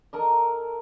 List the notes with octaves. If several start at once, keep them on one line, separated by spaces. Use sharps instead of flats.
A4 A#4 D#5